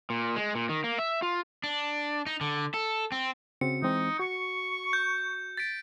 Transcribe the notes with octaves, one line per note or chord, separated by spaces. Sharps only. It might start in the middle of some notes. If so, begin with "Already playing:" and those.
A#2
G#3
A#2
D#3
A#3
E5
F4
D4
D#4
D3
A4
C4
C#3 C4 F#4 C#7
E3 G#3 C4 D#4
F#4 C#6
G6
A6 B6 D7